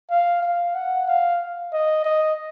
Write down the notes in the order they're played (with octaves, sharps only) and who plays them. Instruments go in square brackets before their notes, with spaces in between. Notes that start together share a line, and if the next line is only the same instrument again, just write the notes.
[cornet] F5
F5
F#5
F5
D#5
D#5